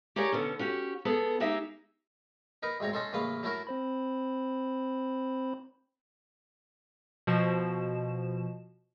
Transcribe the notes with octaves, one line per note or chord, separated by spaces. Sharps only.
G4 G#4 A#4 C#5 D5 G#5
B2 D3 B3 C#4
C#4 F#4 G4
B3 G#4 A4
G#3 A#3 D#4 G4 G#4 E5
D#4 A#4 B4
D2 G#2 C4 C#5 A#5
C#4 D#4 A4 C#5 C6
A1 C#3 A#3 B4 F5
F#3 A3 E4 F#4 A#4
C4 C5 B5
B2 F3 E7